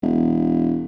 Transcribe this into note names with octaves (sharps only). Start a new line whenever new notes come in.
E1